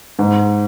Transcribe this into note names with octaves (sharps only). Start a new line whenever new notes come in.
G#2